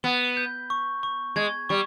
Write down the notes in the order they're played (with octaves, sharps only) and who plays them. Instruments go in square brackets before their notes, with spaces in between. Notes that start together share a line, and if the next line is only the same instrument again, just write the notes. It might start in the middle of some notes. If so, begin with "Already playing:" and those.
[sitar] B3 [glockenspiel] G7
[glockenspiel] G6
C#6
C#6
[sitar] G#3 [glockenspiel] G#6
[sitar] G3 [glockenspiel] C#6